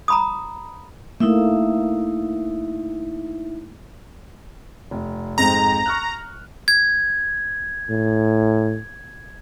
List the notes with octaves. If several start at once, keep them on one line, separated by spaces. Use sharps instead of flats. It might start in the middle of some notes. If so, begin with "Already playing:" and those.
A#5 B5 D#6
A3 A#3 D#4 E4 E5
F1
F2 G#2 C4 A#5
C#6 F6 F#6
G#6
A2